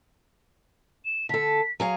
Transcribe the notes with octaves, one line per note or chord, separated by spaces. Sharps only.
E7
D3 A4 B6
F#3 G#4 F5